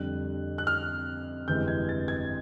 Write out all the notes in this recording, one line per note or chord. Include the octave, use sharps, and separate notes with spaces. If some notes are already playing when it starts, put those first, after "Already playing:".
Already playing: F2 D3 G3 F#6
F#6
F6
G1 F2 C3 E3 G#3 G6
G#6
A6
G#6